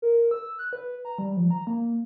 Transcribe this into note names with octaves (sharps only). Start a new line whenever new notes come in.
A#4
E6
F#6
B4
A#5
G3
F3
A#5
A#3